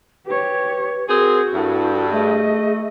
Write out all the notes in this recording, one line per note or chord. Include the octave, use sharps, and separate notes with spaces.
G4 B4 C#5
C4 F#4 G#4 A#4
G2 E4 A4
A3 G#4 D#5